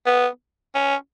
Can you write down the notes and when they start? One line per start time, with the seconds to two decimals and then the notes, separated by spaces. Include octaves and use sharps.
0.06 B3
0.75 C#4